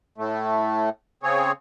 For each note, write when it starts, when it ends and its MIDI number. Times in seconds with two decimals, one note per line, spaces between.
0.18 0.89 45
0.18 0.89 57
1.23 1.52 49
1.23 1.52 60
1.23 1.52 68
1.23 1.52 73